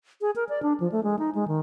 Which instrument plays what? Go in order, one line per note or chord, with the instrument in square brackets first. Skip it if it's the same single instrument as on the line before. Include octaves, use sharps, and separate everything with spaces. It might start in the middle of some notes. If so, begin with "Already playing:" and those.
[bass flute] G#4
A#4
D5
D4
F3
A3
G#3
D#4
G#3
D#3